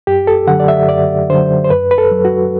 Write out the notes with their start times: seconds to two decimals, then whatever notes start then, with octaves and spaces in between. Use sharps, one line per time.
0.07 F#2 G4
0.27 A4
0.47 D3 F#3 F#5
0.60 D5
0.68 E5
0.88 F#2 D5
1.30 D3 F#3 C5
1.65 C5
1.70 F#2 B4
1.91 B4
1.98 A4
2.11 F#3
2.25 F#4